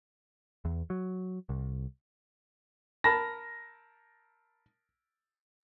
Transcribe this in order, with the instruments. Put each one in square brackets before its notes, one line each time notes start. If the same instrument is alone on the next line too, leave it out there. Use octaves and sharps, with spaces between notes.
[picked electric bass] E2
F#3
C2
[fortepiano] A#4 A5 B5 [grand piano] A#6